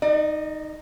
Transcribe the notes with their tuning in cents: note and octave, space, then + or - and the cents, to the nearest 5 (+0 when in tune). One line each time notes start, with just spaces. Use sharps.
D#4 +0 D5 +40